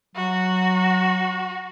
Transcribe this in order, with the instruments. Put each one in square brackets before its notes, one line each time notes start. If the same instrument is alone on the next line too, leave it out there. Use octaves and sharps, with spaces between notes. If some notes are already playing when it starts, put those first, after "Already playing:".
[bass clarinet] F#3 [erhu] F#4